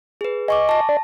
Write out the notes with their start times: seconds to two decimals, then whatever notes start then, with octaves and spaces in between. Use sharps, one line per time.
0.21 G#4 B4
0.48 D#5 G#5 C#6 D6
0.69 A5 A#6
0.89 D5